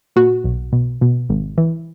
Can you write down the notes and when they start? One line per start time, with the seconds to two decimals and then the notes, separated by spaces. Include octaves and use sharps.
0.16 A#2 F#4
0.44 B1
0.72 B2
1.01 B2
1.29 G#1
1.58 E3